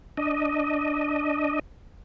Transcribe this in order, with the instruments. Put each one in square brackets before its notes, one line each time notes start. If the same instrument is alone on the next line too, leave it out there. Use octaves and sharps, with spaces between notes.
[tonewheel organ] D4 D#5